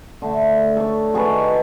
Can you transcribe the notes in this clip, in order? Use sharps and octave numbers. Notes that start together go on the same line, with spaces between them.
D3 A3
A4 C#5 D5
F#4 G#4 A4 B4
D#3